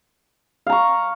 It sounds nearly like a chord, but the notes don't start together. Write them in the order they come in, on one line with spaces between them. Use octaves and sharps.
F5 A#5 C#6